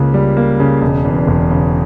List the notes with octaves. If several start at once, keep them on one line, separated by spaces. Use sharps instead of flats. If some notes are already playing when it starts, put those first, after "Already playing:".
Already playing: C#2 C#3 A#3
G3
A#3
C#3
E1
E2
E1
C#3